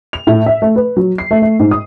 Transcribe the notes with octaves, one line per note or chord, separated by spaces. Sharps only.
F7
A2
E5
A3
B4
F#3
C7
A3
A3
G#2
D#6